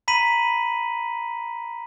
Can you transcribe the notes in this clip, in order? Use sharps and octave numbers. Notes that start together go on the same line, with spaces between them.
A#5 B5 B6 D#7 F#7